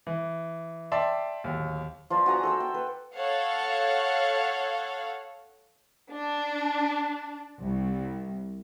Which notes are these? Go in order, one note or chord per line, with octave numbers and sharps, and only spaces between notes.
E3
D5 E5 G5 A5 C6
D1 D#2
F3 C5 D5
F#4 G#5 A#5 D#6
A4 C5 E6
G5
B4
A4 C#5 F5 F#5
D4
C2